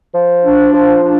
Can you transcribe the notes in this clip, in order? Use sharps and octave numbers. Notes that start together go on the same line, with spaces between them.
F3
D4
F3
D4